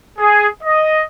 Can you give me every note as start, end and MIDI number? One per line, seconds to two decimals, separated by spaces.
0.19 0.47 68
0.63 1.02 75